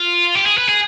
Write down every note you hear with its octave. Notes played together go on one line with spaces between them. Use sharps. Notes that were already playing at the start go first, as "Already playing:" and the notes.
Already playing: F4
G4
G#4
B4
G#4